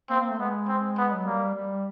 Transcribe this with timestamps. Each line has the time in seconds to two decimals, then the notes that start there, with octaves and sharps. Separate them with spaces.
0.10 A#3 C4
0.20 A#3
0.30 A3
0.39 G#3 B3
0.68 C4
0.98 B3
1.15 F#3
1.26 G3 A#3
1.55 G3